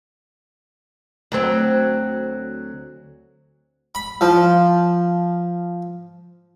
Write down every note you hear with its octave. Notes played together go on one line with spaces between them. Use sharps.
D2 F#3 C4
B5
F3